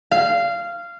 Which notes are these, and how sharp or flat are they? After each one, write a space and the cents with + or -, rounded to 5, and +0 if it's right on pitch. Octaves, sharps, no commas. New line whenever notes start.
F5 -15